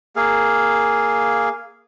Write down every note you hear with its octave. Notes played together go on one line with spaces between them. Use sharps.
A#3 G#4 F5